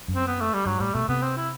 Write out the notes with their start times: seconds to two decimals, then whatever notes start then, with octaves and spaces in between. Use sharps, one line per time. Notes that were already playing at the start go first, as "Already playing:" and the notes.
0.08 F#2
0.15 C4
0.27 B3
0.41 A3
0.53 G3
0.65 G2 F#3
0.80 A2 G3
0.94 B2 A3
1.09 C3 B3
1.22 C4
1.37 E4